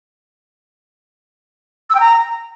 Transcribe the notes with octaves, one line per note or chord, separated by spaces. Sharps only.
E6
G5
A#5